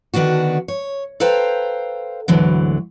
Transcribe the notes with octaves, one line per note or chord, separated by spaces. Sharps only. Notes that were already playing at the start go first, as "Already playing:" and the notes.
D3 D#3 B3 D4 F#4
C#5
A4 B4 C5 F5 G5 A#5
D2 G#2 D3 E3 F#3